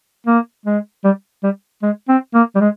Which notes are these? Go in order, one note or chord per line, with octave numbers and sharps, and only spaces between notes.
A#3
G#3
G3
G3
G#3
C4
A#3
G3
G#3